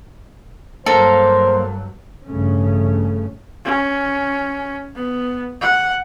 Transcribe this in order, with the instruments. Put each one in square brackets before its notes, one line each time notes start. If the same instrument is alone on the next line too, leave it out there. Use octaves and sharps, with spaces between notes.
[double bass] G2 F#3 [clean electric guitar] A#3 A#4 [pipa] A4 [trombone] C5
[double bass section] A1 G2 C#3 A3 C#4
[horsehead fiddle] C#4
B3
F#5